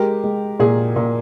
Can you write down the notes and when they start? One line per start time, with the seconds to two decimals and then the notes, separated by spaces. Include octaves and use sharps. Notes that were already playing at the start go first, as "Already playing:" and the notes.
Already playing: G#3 G4 A#4
0.24 G#3
0.59 A#2 G#4
0.96 A#2